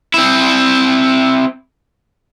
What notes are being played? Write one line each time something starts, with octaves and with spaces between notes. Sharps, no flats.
C4 E4